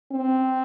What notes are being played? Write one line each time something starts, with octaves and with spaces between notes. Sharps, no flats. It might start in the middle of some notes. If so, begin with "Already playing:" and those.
C4